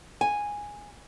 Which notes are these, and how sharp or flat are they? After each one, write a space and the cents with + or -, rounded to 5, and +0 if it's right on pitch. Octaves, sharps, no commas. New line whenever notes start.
G#5 -5